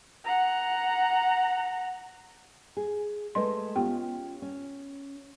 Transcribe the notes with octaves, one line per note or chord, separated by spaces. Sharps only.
F#5 A#5
G#4
G#3 A3 B4 D#5 C6
B3 C#4 F4 G4 G5
C#4